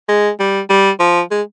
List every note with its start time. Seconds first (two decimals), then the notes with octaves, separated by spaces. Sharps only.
0.09 G#3
0.39 G3
0.70 G3
1.00 F3
1.31 G#3